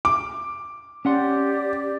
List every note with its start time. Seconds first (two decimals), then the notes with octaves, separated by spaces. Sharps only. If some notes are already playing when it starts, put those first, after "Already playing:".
0.05 D6
1.05 C#4 G4 D5 F#5 C6